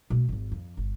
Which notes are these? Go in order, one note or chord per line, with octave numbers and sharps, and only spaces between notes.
B2 A3
G#1 F2
F2
G1